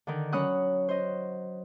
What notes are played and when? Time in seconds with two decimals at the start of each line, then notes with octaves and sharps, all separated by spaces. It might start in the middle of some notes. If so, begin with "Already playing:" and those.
0.07 D3 D#3
0.32 F#3 C#4 F#5 B5 D#6 F#6
0.89 C5 D#5